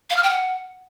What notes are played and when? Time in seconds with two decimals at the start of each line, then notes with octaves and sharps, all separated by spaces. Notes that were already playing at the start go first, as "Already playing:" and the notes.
0.10 F5
0.17 F6
0.23 G5
0.30 F#5